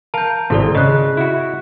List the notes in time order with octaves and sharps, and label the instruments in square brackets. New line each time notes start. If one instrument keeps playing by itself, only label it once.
[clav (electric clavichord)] A#4 F5 [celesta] A5 G6
[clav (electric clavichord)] G#1 C3 [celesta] E4 A4 D5
[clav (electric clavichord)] C#3 [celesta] D#5 F#6
[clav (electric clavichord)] E4 F#4